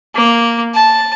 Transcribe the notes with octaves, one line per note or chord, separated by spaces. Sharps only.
A#3
A5